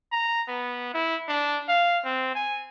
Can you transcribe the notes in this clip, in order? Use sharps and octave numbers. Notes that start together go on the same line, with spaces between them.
A#5
B3
E4
D4
F5
C4
G#5